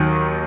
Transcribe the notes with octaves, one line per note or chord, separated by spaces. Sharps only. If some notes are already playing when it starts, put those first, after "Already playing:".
Already playing: D#2 D#3 F#3